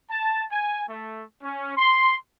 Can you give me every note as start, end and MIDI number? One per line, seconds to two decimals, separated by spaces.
0.10 0.44 81
0.52 0.82 80
0.89 1.23 57
1.43 1.76 61
1.77 2.16 84